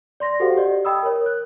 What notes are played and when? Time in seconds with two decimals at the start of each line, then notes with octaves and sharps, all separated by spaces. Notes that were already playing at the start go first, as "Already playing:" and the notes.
0.20 D5 C6 A#6
0.40 F#4 G4 A4 C5 F5 F#5
0.56 G4 D5 D#5
0.85 D#5 G5 B5 D#6 E6
1.03 A#4 C#5
1.26 F#6